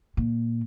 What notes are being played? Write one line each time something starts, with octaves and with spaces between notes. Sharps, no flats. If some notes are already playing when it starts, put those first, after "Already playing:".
A#2